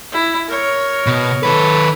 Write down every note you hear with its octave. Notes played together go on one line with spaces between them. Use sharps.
E4
A#4 C#5
B2
D#3 A4 B4